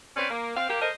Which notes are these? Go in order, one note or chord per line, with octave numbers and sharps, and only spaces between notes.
C4 C#4 B4 D5
A#3
C4 F5
A#3 G4
A4 A#4 C5 D#5